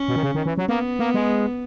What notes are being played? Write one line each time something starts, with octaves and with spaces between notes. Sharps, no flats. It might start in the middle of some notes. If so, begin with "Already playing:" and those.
Already playing: C#4
B2
D#3
C#3
D#3
E3
F#3
A#3 B3
A#3
G#3